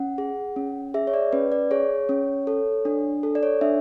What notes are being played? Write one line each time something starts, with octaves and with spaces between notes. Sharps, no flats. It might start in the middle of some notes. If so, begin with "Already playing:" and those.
Already playing: C#4 F#5
G#4
C#4
G#4 E5
C#5
D5
C#4 B4
D5
G#4 C#5
C#4
A4
D4
A4
D5
C#5
D4 E5